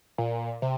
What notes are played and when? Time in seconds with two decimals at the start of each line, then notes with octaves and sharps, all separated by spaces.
0.18 A#2
0.62 C3